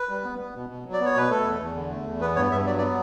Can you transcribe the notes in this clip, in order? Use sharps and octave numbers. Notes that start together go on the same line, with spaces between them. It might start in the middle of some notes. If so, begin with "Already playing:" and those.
Already playing: B4
G3
B3
B3
B2
B2
F#3
D5
B3
C#5
B2 B4
A3 A4
E2
E2
D3
A3
E2
B3 B4
G2 C#5
G2 E5
F#3 D5
D5
B3